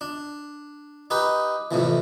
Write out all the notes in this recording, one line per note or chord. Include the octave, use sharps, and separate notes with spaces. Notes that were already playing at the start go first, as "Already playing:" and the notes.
D4
D#4 G4 B4
F2 A2 C3 E3